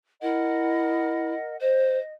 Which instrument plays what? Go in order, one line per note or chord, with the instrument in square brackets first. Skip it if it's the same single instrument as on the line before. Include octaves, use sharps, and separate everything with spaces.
[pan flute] E4 [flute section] A#4 D#5 F#5
[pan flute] C5 [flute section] D#5